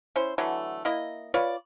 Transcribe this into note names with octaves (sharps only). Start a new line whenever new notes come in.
C#4 E4 C5
D3 E3 F#3 A3
A#3 E4 D#5
F4 B4 C#5 D5